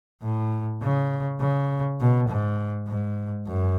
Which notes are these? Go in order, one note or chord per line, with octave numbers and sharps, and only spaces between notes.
A2
C#3
C#3
B2
G#2
G#2
F#2